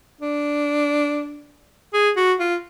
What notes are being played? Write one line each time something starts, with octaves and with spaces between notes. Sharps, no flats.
D4
G#4
F#4
F4